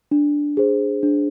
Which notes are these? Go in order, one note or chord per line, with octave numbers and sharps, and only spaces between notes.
D4
G#4 C5
D4